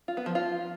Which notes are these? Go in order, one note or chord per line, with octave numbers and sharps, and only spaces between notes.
F4
B3
F3
F4